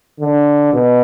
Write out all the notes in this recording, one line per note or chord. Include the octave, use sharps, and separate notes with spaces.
D3
B2